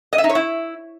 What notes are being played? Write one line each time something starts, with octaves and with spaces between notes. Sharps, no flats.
D#5
E5
D#4
C#5
E4